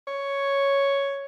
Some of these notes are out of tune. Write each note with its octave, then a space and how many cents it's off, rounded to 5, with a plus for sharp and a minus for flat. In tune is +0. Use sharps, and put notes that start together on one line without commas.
C#5 +5